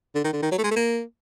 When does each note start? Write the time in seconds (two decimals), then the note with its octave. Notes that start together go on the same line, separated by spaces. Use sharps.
0.15 D3
0.24 D#3
0.33 D3
0.42 D#3
0.51 F#3
0.58 A3
0.64 G#3
0.71 A3
0.76 A#3